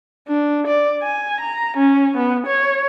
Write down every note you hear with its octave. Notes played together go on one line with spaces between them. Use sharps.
D4
D5
G#5
A#5
C#4
B3
C#5